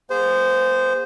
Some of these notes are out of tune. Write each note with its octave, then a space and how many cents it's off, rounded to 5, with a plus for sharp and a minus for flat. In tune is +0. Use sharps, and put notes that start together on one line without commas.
A#3 +30 G#4 -25 C5 -15